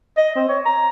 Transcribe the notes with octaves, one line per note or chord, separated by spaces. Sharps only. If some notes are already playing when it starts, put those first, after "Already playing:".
D#5
C4
C#5
A#5